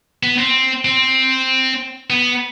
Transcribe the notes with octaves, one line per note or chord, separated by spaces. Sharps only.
B3
C4
C4
B3